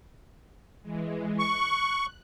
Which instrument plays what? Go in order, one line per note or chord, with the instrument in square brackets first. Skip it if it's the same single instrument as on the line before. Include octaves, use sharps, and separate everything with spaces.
[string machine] E3 G#3
[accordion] C#6 [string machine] F#6